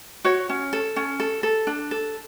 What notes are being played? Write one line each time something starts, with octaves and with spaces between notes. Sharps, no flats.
F#4 C#5
C#4
A4
C#4
A4
A4
D4
A4